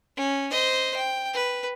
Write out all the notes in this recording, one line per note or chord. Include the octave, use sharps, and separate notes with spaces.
C#4
C5 D#5
G5
B4